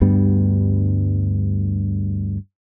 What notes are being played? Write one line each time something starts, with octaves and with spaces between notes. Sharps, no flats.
D2 G2 G3 B3